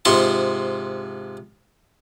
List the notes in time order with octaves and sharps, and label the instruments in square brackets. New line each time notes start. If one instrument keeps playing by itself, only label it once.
[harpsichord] G#2 C3 F3 C6 C#6